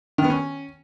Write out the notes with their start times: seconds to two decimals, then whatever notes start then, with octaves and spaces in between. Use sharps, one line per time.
0.18 D#3
0.24 B3
0.30 C#4